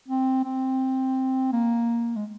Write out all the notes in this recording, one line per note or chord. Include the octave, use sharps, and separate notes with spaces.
C4
C4
A#3
G#3